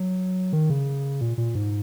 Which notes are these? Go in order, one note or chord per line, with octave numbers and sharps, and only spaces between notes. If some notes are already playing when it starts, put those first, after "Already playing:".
Already playing: F#3
D#3
C#3
A#2
A#2
G#2